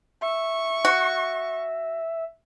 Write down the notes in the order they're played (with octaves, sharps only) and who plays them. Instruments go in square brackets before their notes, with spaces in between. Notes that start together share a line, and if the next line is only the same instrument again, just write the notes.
[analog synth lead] E5 [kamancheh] C#6
[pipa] F#4